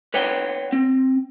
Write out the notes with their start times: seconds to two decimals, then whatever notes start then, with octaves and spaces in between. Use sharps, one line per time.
0.14 B4 C#5 F#5 G5
0.72 C4